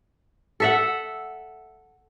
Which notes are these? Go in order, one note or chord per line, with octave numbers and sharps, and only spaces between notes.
A4 E5 F#5